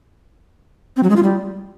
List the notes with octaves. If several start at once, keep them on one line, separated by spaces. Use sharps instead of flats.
C4
F#3
G#3
F4
G3